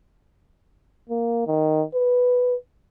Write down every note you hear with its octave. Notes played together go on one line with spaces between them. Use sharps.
A#3
D#3
B4